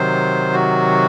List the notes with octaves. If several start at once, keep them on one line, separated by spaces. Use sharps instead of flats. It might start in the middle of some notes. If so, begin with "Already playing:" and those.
Already playing: C3 D#3 F#3 C5
F#4